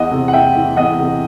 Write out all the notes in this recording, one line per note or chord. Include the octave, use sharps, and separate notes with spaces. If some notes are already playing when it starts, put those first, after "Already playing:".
Already playing: E2 D#5 F#5
C3
F#5
E2 E5 G5
E3
E2 D#5 F#5
C3